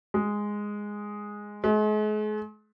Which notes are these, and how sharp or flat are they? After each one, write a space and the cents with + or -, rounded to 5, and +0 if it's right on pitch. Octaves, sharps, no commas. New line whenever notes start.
G#3 -5
G#3 +40